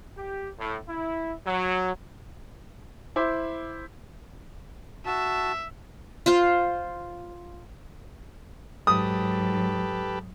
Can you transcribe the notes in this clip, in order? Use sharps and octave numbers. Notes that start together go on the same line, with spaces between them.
G4
A2
E4
F#3
E4 C5 D6
F#4 E5 A5
F4 C5 F5
G#2 F#3 G4 A4 B4 D#6